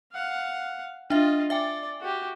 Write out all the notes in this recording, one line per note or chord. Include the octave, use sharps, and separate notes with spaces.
F5 F#5
D4 F4 D#5 E5
D5 E5 G5 G#5
F#4 G4